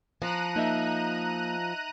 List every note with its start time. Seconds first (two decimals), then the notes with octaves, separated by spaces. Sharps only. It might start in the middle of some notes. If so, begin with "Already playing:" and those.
0.22 F3 A#5 F#6 D#7
0.56 A#3 D#4 D#5 E5